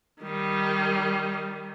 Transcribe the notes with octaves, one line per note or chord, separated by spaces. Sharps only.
D#3 G3